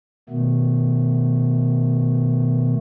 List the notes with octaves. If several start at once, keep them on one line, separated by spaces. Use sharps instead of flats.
B2 D#3 A3 B3